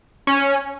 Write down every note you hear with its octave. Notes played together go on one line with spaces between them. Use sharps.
C#4